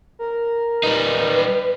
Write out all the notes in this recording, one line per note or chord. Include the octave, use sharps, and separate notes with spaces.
A#4
G3 D#4 B4